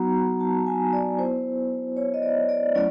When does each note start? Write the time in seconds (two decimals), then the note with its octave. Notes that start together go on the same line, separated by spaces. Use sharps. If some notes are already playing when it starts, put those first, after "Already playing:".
Already playing: F#3 B3 D#4 F#4 A#5
0.40 A5
0.66 G#5
0.93 D5
1.18 B3 E4 C5
1.97 C#5
2.14 D#5
2.22 D5
2.49 D5
2.75 F#3 A3 C#4 E4 D5